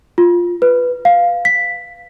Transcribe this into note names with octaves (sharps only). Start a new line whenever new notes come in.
F4
B4
F5
B6